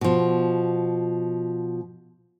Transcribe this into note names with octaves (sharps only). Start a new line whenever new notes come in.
B2 F3